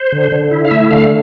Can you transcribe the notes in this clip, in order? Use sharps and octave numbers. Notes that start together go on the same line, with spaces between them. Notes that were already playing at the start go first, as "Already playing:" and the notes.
Already playing: C5
D3
D3
E4
F5
A3 E5
D3 F5